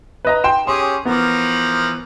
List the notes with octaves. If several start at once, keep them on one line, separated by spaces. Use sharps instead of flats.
B4 D#5 A#5
G5 C6 E7
C#4 G4 G#4 C6
E3 F3 B3 A#4